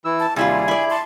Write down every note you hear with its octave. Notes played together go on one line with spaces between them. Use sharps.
E3 E4 E6
A5
D#2 C3 G3 E4 F4 G#4
E4 D5
A5 C6